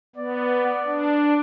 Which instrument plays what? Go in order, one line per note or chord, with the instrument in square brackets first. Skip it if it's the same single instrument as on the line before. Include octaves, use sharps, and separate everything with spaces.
[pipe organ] B3 [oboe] D5
[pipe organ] D4